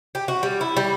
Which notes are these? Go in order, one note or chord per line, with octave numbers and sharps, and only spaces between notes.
G4
F#4
G3
E4
G3